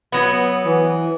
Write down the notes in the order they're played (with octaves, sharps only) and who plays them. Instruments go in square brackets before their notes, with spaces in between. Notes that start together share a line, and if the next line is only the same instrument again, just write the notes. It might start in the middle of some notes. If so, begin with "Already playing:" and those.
[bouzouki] F#3 B3
[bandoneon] E3